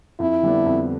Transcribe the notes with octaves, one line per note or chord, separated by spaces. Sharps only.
F2 E4
D3 G3 B3 D4
F2